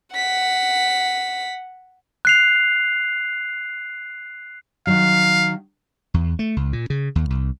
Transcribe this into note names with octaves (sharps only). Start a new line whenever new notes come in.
F#5 B6
F#6 C7 F7
D#3 F#3 F5
E2
A3
C#2
A#2
C#3
D#2
C2